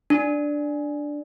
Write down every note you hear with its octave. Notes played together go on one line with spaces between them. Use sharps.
D4